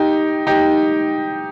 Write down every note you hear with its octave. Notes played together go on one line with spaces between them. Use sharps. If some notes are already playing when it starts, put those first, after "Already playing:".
Already playing: D#4 G4
D#4 G4